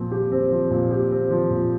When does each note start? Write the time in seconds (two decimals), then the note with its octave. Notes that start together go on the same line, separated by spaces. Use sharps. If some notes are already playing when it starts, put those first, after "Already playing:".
Already playing: A#2 F3 C4
0.12 G4
0.32 C4
0.51 F3
0.70 A#2
0.91 G4
1.11 C4
1.31 F3
1.51 A#2